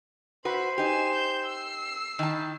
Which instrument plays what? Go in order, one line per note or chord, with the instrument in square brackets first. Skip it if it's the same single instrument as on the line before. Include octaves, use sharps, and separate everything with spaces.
[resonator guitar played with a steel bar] F#4 B4 [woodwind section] C5 C6 [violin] E5 B5
[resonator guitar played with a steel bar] D#4 G4 [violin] G#5 E7
[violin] G6 E7
E6 C7
[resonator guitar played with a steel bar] D#3 A5 [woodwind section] E4